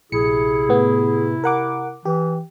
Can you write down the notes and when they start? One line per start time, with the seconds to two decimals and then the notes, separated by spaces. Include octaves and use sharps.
0.12 A#1 C3 E4 G#4 C#7
0.69 A2 B3
1.44 A#4 F#5 D6
2.05 E3 G4